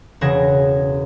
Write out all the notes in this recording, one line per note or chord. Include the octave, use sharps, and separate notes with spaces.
E1 C#3 F#5 G#6 A#6 E7